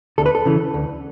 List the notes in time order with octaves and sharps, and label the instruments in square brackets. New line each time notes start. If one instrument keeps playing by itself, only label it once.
[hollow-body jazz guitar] D2 A4
B4
A4
C#3 E3
D2